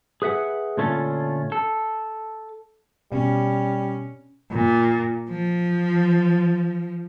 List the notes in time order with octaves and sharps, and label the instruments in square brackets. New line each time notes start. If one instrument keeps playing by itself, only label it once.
[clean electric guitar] G#4 B4 E5 F#5
A#2 D3 A3 C#4 F4 A4
A4
[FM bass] B2 [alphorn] G3 [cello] C#4
[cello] A#2
F3